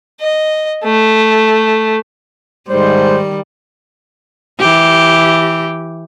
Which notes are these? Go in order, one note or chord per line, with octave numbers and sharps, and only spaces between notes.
D#5
A3
G#2 D#3 G3 C5
E3 G4